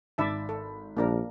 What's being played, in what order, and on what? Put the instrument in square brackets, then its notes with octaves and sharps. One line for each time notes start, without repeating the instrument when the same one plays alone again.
[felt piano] G#1 D#4 B5 [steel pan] D5 E5 A5
[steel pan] A4
[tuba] A#1 [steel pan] A#3 D4 A#4